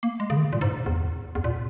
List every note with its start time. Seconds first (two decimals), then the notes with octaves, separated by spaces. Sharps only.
0.03 A#3
0.20 G#3
0.30 C#3
0.37 D#3
0.44 C#3
0.53 A#2
0.61 G#2
0.86 E2
1.35 E2
1.44 A#2
1.52 B2